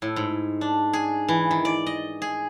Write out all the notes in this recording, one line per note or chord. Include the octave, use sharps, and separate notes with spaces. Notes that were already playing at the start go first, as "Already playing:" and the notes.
A2
G#2
D4
G#4
E3
D#3
D5
D#5
G#4